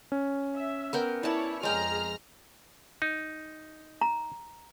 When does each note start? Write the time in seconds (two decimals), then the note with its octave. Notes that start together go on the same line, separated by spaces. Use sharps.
0.12 C#4
0.56 E5
0.93 B3 A#4 G5
1.23 E4 C#5 D5 A5
1.63 F2 G#3 G#4 G5 A#5 F6
3.02 D#4
4.01 A#5